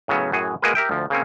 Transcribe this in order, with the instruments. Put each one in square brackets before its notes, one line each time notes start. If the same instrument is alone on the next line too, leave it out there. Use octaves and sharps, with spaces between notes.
[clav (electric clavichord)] A2 C#3 F#3 B3 C#4
F#2 A2 F#4 G#4
G#3 A#3 F#4 G#4 A#4 B4
G4 A#4 E5 G5
D2 F3
C#3 A#3 C4 C#4